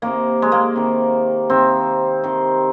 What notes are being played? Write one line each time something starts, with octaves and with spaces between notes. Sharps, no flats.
C3 D#3 A#3
G#3
A#3
C3 D#3
C3 D#3 C4
C3 D#3